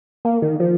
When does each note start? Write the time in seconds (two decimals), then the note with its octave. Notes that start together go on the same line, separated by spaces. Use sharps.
0.25 A#3
0.42 D#3
0.60 F3